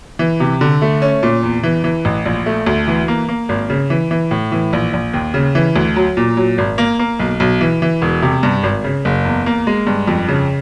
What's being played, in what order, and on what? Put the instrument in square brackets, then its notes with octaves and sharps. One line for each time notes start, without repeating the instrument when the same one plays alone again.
[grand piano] E3
C3
D3
A3
C#4
A#2
E2
E3
E3
A1
A#1
A3
D2
E3
A#3
A#3
G#1
C#3
E3
E3
A2
E3
A#1
A#1
D#2
C#3
E3
D2
F#3
A#2
F#3
G#1
A#3
A#3
B1
B1
E3
E3
E1
C3
G2
G#1
C#3
F#1
E2
A#3
G#3
G2
F2
C#3